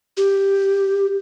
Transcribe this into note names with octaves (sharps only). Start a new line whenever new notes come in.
G4